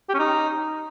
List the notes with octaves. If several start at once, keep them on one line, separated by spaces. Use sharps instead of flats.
G4
C#4
D#4